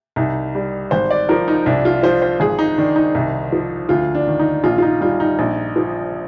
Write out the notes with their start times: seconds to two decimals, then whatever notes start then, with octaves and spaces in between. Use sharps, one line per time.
0.16 C2 D#4
0.55 G3
0.91 G#1 C5
1.11 D5
1.29 F3 A#4
1.48 D#4
1.66 C2 D4
1.85 F4
2.03 F3 C5
2.22 C5
2.40 G#1 G#4
2.59 D#4
2.78 D#3 D4
2.96 D#4
3.15 C2
3.52 F3
3.89 D2 F4
4.15 D4
4.27 D#3
4.40 D#4
4.64 A#1 F4
4.78 F4
4.82 D#4
5.01 G3 F4
5.20 D#4
5.39 A#1
5.76 F3